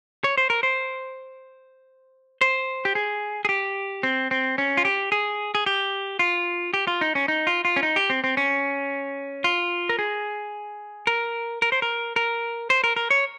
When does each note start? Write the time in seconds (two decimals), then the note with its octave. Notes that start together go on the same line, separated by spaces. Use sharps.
0.24 C#5
0.38 C5
0.50 A#4
0.63 C5
2.41 C5
2.85 G4
2.95 G#4
3.45 G#4
3.49 G4
4.03 C4
4.31 C4
4.58 C#4
4.77 F4
4.85 G4
5.12 G#4
5.55 G#4
5.66 G4
6.19 F4
6.74 G4
6.87 F4
7.01 D#4
7.15 C#4
7.28 D#4
7.47 F4
7.65 F4
7.76 C#4
7.83 D#4
7.96 G4
8.10 C4
8.24 C4
8.37 C#4
9.44 F4
9.89 A#4
9.99 G#4
11.07 A#4
11.62 A#4
11.72 C5
11.82 A#4
12.16 A#4
12.70 C5
12.84 A#4
12.96 A#4
13.10 C#5